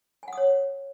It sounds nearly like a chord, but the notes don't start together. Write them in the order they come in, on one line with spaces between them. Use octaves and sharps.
G#5 F#5 D#6 C#5